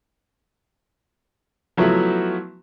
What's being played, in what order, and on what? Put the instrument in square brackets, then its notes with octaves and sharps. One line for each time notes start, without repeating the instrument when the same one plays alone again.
[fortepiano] F3 F#3 A3 B3 E4 F#4